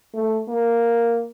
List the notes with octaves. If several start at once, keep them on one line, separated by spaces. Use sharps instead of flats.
A3
A#3